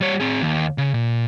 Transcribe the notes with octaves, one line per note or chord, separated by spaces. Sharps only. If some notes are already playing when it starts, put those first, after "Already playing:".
G3 C#5
C4 G#4
D#2
C#3
A#2